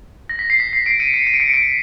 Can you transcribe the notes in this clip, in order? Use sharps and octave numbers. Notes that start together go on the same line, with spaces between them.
A#6
B6
C7
B6
C7
C7 D7
C#7 D#7
C#7 D#7
C#7 D#7
D7
B6 C#7
D7
B6 C#7